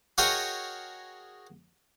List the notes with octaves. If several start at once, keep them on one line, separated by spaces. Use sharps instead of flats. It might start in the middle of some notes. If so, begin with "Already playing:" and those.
F#4 G#4 A#4 C#5 D#5 G5